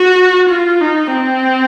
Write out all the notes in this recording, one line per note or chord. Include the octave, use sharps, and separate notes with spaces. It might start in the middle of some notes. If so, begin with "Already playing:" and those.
Already playing: F#4
F4
D#4
C4